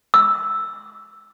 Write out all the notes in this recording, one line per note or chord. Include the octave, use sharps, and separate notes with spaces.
E6